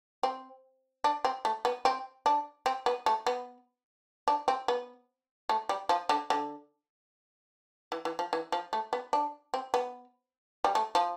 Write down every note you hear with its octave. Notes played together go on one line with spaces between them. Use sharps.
C4
D4
C4
A3
B3
C4
D4
C4
B3
A3
B3
D4
C4
B3
A3
G3
F3
D3
D3
E3
E3
F3
E3
F3
A3
B3
D4
C4
B3
G3
A3
F3